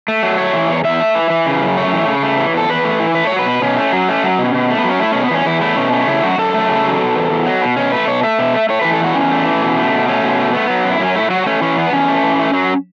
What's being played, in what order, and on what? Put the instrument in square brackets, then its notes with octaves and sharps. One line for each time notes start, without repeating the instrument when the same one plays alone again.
[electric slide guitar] A3
F#3
A3 C#5
E3
E2
E2 E5
A3
E3
E3
C#3
F#2
A3 C#5
E3
C#3
A3
E3
E2 A4
E2 B4
A3
E3
A3 B4
F#3 C#5
B4
B2
B2 C#4
A3
F#3
A3
F#3
B2
B2
A3
B3
F#3 C#4
A3 E4
B2 C#4
B3
E2 C#4
E2 E4
A3 E4
B2 C#4
A3 C#4
C#3 E4
F#2 F#4
F#2 A4
A3
C#3
F#3
B2
E2
E2
F#3
B2
B2 C#4
A3 B4
B2 C#5
A3 E5
B2
A3
A3 C#5
E3 B4
A4
E2 F#4
E2 C#4
A3
E3
B2
A3
B2
A3 C#4
B2
A3
A3 B3
F#3
F#2
E4
F#2 C#4
A3 E4
F#3 F#4
A3 C#4
E3 C#4
E2 B3
E2 C#4
A3
E3
A3
F#3